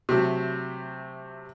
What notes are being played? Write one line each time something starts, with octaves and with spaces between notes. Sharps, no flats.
C3 F#3 A3